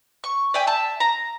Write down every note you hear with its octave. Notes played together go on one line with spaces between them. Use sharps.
C#6
D5 E5 G5 G#5
E5 A5
A#5